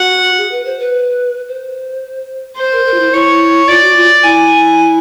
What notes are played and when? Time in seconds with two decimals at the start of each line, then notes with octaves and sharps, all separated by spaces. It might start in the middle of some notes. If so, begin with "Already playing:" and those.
Already playing: F#4 F#5
0.38 G#4
0.51 B4
0.65 C5
0.80 B4
1.48 C5
2.57 C5
2.72 A#4
2.86 A#4
2.94 F4
2.99 E4
3.13 E4 C#5
3.68 F4 D5
3.82 F#4
3.95 F4
4.23 E4 G#5